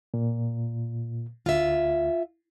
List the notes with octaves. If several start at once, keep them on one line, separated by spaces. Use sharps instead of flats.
A#2
D2 F4 E5